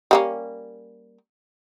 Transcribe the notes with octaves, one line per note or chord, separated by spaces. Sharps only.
G3 A#3 C#4